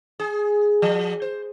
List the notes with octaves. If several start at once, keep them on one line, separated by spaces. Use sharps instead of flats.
G#4
F3
C5